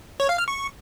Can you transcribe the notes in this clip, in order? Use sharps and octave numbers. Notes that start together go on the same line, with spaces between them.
C#5
F5
F6
C#6